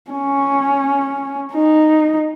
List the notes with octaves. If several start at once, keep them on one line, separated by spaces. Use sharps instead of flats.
C#4
D#4